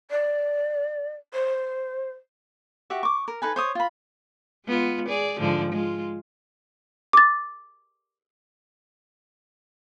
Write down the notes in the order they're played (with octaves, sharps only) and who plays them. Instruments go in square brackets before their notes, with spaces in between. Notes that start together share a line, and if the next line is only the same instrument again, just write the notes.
[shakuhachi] D5
C5
[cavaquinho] F#4 G4 E5
C#6 D6
A#4
D#4 A4 B4 G#5
C5 C#5 D#6
F4 B5
[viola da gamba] G#3 B3 F4
G#4 D5
G#2 D3 F3
G#3 F4
[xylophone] D6 A6